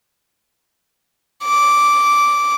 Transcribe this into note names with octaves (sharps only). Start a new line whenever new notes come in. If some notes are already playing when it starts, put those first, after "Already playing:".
D6